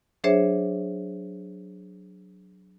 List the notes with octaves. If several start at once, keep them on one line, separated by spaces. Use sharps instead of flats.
F#3 D4 G#4 C5 C#5 E5